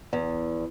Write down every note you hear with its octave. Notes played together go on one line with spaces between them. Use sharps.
E2